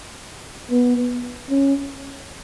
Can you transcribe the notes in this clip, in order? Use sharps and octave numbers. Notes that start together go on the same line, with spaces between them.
B3
C#4